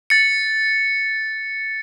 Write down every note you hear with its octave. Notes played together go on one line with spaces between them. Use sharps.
A6 C#7